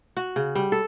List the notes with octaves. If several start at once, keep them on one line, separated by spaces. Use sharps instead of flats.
F#4
C#3
G3
A4